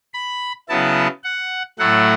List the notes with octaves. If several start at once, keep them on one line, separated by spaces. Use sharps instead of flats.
B5
C#3 F#3 B3 E4 A5
F#5
A2 F#3 A3 E4 F#5